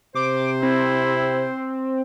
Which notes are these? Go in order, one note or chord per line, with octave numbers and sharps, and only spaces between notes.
C3 C5 D6
C4 E4